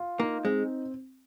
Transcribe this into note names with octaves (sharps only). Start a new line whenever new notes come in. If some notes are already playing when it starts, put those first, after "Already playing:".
Already playing: F4
A#3 D#4
G#3 C4